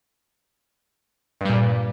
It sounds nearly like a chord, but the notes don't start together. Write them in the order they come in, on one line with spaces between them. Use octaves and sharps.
G2 G3 A#2